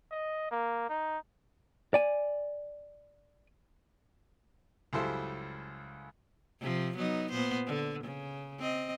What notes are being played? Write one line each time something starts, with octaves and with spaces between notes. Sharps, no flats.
D#5
A#3
D#4
D5 G#5
C#2 F#2 G3 E4 A4 C5
C3 F3
F#3 B3 D#4
A#2 B3 C5
D3
C#3
C4 D#5